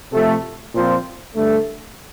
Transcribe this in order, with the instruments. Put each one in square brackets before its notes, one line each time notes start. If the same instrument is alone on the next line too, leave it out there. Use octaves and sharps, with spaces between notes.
[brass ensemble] C3 F3 A3
A#2 F3 C4 F4 C5
G2 D3 A3